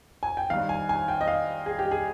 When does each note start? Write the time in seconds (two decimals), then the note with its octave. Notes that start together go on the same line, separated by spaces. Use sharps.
0.23 G#5
0.37 G5
0.50 G2 D#3 F5
0.69 G#5
0.89 G#5
1.08 G5
1.21 D#5
1.28 F5
1.66 G#4
1.79 G4
1.91 G#4